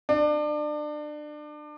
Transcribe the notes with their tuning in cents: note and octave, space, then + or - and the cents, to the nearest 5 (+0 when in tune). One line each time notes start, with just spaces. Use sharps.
D4 +30